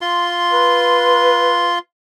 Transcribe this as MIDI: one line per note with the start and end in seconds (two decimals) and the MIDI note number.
0.01 1.79 65
0.01 1.79 84
0.52 1.75 71